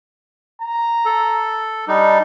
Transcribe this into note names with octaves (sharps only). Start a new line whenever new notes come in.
A#5
A4
G3 D4 D#4